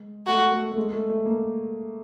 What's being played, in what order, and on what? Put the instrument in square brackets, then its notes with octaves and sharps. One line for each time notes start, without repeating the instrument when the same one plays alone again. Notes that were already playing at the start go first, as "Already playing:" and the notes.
Already playing: [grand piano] G#3
[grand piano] A3 [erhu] F#4
[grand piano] A3
A3
G#3
A3
A3
A#3